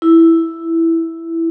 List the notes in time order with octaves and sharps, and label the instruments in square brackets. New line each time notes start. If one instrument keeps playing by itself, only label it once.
[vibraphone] E4